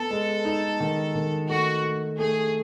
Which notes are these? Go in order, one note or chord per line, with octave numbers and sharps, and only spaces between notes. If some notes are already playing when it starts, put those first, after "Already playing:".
Already playing: B3 A4
G#3
D#4
D#3
D#3
A3 F#4
A3
A3 G#4